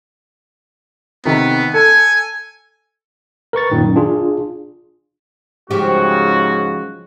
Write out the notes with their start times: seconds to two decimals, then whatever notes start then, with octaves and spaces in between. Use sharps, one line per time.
1.25 C3 D#3 B3
1.74 A4 G#5
3.53 A#4 B4 C#6 A6
3.71 F#2 A#2 D#3
3.96 D4 F4 G#4
5.71 G#2 C#3 F3 F#4 G4